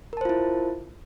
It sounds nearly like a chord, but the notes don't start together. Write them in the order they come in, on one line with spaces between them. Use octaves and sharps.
A#4 A5 C5 F4 E4